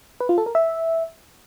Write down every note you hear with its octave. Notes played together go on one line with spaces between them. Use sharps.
B4
F4
A4
A#4
E5